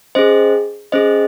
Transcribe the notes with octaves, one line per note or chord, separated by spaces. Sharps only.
C#4 G#4 C5 D#5
C#4 G#4 C5 D#5